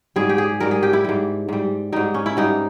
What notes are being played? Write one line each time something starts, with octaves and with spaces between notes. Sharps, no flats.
G#2 G3 G#4
G4
G#4
G#2 G3 A#4
G#4
G4
E4
G#2 G3
G#2 G3
G#2 G3 D#4
C#4
E4
G#2 G3 D#4